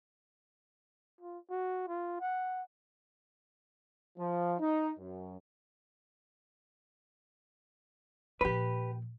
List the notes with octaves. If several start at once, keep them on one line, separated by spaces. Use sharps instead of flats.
F4
F#4
F4
F#5
F3
D#4
F#2
A#2 F3 G4 B4